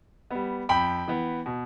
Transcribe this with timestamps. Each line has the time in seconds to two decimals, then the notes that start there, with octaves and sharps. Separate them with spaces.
0.30 G3 B3
0.69 F2 G5 B5
1.08 E3 B3
1.46 B2